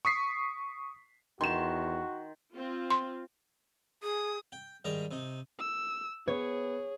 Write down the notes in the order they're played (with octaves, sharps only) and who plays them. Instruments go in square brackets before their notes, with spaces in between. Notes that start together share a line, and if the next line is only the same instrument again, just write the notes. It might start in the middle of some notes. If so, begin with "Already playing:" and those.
[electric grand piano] C#6 D#6 B6 C7
[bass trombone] E2 [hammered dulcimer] D#3 [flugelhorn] F#4 [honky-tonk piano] C6 E7
[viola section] C4 F4
[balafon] C6
[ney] G#4 [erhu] D#6
[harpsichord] G5
G#2 D#3 G3 A#5
C3 D#4
[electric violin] E6
[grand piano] B3 [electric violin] G#4 [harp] C#5